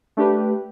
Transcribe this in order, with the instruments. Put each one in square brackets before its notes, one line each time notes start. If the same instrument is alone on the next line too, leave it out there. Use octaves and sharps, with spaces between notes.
[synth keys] A3 D4 G4 B4